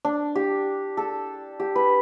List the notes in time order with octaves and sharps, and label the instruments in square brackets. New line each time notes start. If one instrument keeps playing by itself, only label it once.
[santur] D4
G4
A4
G4
B4